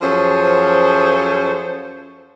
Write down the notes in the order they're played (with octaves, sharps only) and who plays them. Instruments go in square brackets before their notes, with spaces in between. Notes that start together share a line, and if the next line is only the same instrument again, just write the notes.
[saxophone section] F#2 F3 G#4 A4 C5 C#5